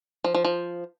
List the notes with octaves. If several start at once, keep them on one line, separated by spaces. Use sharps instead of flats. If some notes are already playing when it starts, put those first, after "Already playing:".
F3
F3
F3